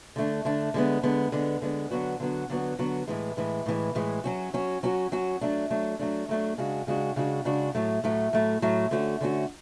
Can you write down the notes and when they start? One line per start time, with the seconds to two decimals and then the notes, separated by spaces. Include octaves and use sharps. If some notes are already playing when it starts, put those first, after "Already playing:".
0.16 D3 A3 D4
0.45 D3 A3 D4
0.74 D3 G#3 B3
1.03 D3 G#3 B3
1.32 D3 G#3 B3
1.62 D3 G#3 B3
1.91 D3 F#3 B3 F#4
2.20 D3 F#3 B3 F#4
2.50 D3 F#3 B3 F#4
2.79 D3 F#3 B3 F#4
3.07 A2 E3 G#3
3.37 A2 E3 G#3
3.66 A2 E3 G#3
3.95 A2 E3 G#3
4.24 F#3 C#4 F#4
4.54 F#3 C#4 F#4
4.83 F#3 C#4 F#4
5.12 F#3 C#4 F#4
5.41 F#3 A3 D4
5.70 F#3 A3 D4
5.99 F#3 A3 D4
6.29 F#3 A3 D4
6.58 C#3 G#3 D4 F#4
6.87 C#3 G#3 D4 F#4
7.16 C#3 G#3 D4 F#4
7.45 C#3 G#3 D4 F#4
7.75 A2 F#3 A3
8.04 A2 F#3 A3
8.33 A2 F#3 A3
8.62 A2 F#3 A3
8.91 D3 A3 C#4 F#4
9.21 D3 A3 C#4 F#4